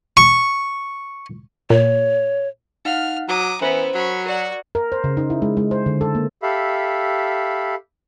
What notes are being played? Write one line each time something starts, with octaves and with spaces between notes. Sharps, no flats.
C#6
A#2 C#5
D#4 F5 F#5 F6
F#3 A#5 D6 D#6
E3 B3 C#4 E4 A#4 C5
F#3 B5 C#6
F#4 A#4 D5 F#5
A#4
C5
C#3
D#4
E4
G#3
G#3
C5
D3
A4
A#3
G4 A4 E5 F5 B5